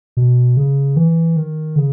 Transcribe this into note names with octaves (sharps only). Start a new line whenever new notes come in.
B2
C#3
E3
D#3
C#3